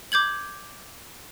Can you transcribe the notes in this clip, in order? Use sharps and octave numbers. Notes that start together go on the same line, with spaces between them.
D6 G6 G#6 F#7